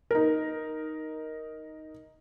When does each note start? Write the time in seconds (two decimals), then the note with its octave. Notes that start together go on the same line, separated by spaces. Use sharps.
0.11 D#4 A#4